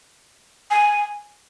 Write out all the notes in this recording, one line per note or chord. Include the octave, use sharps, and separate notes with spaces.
G#5